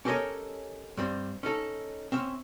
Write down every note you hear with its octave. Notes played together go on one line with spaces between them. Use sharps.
C#4 G4 A4 A#4 C#5 D#5
G2 G3 C4
C#4 D#4 A4
C4 C#4 E5